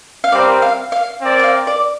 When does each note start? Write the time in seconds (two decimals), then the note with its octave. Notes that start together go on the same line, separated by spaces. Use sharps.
0.24 F5
0.31 G3 C4 A#4 D5
0.62 F5
0.92 F5
1.22 C4 A#4 D5
1.39 G5
1.44 F5
1.67 D5